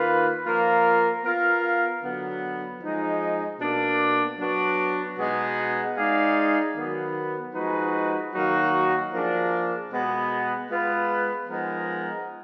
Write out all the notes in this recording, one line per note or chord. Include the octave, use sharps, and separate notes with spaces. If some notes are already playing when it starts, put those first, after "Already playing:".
Already playing: D#3 A#3 F4 B4
F3 A#3 F4 A#4
B3 F4 A#4 F5
D3 F#3 B3
F3 G#3 D#4
B2 A#3 D4
F#3 B3 D4 F#4
B2 G#3 B3 D#4 G#4
G#3 D#4 G#4 D5 F5
D#3 F#3 B3
F3 G#3 D#4 F#4 B4
D#3 F#3 A#3 D#4 F#4
F3 A#3 D4 G#4
B2 G#3 B3
G#3 B3 F4 B4
F3 G#3 B3 D#4 A#4